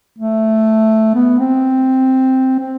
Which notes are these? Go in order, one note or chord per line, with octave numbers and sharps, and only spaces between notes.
A3
B3
C4
C4